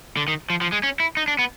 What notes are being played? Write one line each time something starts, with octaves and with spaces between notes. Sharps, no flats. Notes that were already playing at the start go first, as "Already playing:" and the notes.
D3
D#3
F3
F3
G#3
C#4
E4
D#4
D4
B3